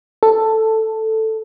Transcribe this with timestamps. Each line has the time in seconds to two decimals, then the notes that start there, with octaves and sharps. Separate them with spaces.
0.23 A4